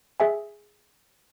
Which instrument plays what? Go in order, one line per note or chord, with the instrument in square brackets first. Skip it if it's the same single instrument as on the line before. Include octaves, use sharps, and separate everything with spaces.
[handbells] G#4 E5 G#5